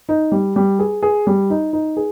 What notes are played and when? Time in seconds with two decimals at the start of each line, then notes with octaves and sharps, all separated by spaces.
0.09 D#4
0.32 G3
0.56 G3
0.79 G#4
1.02 G#4
1.27 G3
1.50 D#4
1.73 D#4
1.97 G#4